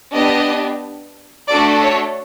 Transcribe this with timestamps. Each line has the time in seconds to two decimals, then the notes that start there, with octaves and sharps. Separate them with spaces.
0.13 B3 D4 G4 D#5
1.47 A3 D4 F#4 A4 D5
1.81 C#5